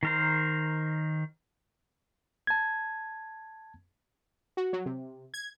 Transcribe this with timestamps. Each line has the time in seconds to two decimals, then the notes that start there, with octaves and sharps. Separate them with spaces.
0.03 D#3 A#4 C5
2.47 A5 G#6
4.57 F#4
4.73 F#3
4.86 C3
5.34 G#6